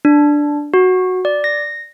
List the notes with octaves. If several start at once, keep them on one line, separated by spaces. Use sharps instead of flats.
D4
F#4
D5
A#6